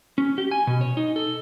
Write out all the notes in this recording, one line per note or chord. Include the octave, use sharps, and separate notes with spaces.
C#4
G4
G#5
B2
C#5
D#4
A4